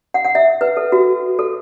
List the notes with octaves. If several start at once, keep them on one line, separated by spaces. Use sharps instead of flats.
F#5
F#5
E5
B4
A4
F#4
A4